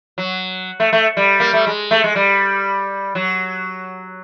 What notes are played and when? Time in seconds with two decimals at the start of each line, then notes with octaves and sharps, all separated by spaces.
0.18 F#3
0.80 A3
0.93 A3
1.17 G3
1.40 A#3
1.53 A3
1.67 G#3
1.91 A3
2.04 G#3
2.16 G3
3.15 F#3